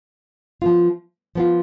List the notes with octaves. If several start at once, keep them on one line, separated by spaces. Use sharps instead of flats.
F3 B3 F4
F3 B3 F4